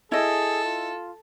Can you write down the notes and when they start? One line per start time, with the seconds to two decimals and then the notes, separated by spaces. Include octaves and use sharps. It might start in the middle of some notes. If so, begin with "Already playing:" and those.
0.12 E4 G#4 A4 D#5
0.64 F4